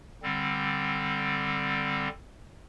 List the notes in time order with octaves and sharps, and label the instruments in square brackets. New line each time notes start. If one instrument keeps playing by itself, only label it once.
[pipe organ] D3 G3 C4